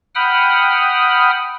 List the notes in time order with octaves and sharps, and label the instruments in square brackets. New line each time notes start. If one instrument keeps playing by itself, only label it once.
[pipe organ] F#5 G5 B5 D#6 F6